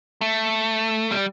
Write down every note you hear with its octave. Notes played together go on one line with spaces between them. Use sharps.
A3
G3